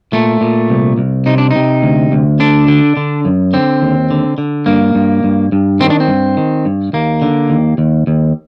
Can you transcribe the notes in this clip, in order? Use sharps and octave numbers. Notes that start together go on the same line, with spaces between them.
A#2 A3
A#2
C2
C2
C3 D#4
D4
C3 D#4
D2
D2
D3 D4
D3
D3
F#2
D3 C4
D#2
D3
D3
G2 A#3
G2
G2
G2
D#3 C4
D4
C4
G2
D#3
G2
D#2 A#3
D3
D#2
D#2
D#2